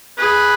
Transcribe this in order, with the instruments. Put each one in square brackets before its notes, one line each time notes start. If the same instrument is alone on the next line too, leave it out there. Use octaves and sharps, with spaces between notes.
[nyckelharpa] G#4 [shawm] B4